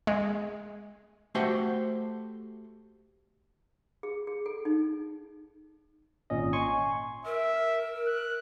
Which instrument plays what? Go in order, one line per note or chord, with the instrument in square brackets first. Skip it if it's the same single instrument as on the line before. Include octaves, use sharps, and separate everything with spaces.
[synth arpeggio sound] G#3
[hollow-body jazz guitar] A3 F#4 G4 C5 F#5 G5
[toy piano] G#4
G#4
A4
D#4
[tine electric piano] G#1 A#2 C#4 D#5
G#5 C6 C#6
[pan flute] A#4 [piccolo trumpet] E5
[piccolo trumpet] F#6